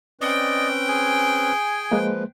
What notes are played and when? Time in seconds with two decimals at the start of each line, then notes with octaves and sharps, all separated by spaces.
0.21 C4 C#4 B4 D5 D#5 G5
0.88 G#4 G#5
1.92 F3 G#3 A#3 B4